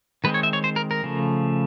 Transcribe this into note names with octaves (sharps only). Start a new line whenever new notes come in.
D#3 G#3 C4 B4
C#5
E5
C#5
C5
A#4
A#4
C#3 F3 A3